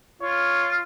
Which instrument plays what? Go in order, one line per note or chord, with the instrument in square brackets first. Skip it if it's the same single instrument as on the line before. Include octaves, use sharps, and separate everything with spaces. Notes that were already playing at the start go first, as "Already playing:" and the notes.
[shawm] F4 [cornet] C#5